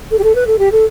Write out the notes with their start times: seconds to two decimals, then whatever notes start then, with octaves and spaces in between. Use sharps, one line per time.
0.11 A4
0.19 G4
0.24 A4
0.35 B4
0.47 A4
0.59 G4
0.72 A4